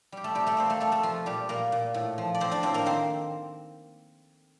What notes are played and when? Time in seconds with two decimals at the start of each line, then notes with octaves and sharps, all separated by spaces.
0.12 G3 G4
0.24 A3 A4
0.35 C3 G3 G4
0.47 A3 A4
0.57 A#3 C4 C5
0.70 A3 A4
0.80 G3 A3 A4
0.92 A3 A4
1.03 F3 A3 F4
1.26 A#2 G3 G4
1.49 A#2 A#3 A#4
1.72 A#2
1.94 A2
2.18 F3
2.35 D5
2.40 F3 C4 C5
2.51 D4 D5
2.63 A2 C4 C5
2.74 A#3 A#4
2.86 D#3 C4 C5